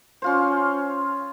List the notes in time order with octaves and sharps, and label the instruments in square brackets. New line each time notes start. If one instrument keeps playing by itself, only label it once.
[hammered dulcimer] C#4 F4 C5